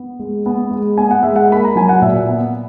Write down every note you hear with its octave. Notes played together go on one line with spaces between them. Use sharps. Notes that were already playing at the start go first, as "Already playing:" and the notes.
Already playing: B3
G#3
B3
G#3
B3 G#5
F#5
G#3 E5
F#5
A#3 B5
A#5
F#3 G#5
F#5
A#2 E5
B3